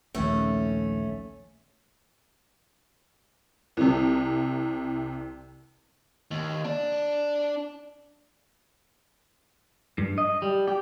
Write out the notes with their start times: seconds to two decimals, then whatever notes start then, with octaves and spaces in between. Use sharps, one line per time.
0.15 A#1 D#2 A3 C#4
3.77 C2 C3
6.31 D#2
6.64 D4 D5
9.98 G2
10.18 D#5
10.42 G3
10.68 G4